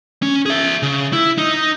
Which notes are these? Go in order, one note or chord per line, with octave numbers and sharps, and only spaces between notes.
C#4
G#4 E5
C#3
E4
D#4